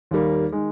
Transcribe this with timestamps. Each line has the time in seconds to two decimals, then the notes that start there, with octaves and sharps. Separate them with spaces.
0.11 D#2 D#3 G3 A#3
0.52 D#3 G#3